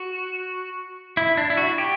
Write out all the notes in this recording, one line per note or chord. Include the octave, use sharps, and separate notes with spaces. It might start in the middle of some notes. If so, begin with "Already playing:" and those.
Already playing: F#4
E4
D4
E4
F#4
G4